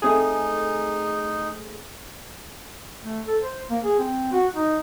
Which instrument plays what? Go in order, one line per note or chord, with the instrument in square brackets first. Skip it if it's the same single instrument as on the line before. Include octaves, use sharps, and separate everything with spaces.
[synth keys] A3 C4 G#4 [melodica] D#4
[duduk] A3
A4
C5
A#3
G#4
C4
F#4
D#4